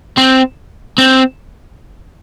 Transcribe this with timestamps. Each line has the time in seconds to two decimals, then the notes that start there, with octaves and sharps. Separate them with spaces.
0.18 C4
0.98 C4